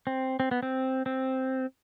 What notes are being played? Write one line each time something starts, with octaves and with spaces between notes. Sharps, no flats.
C4
C4
B3
C4
C4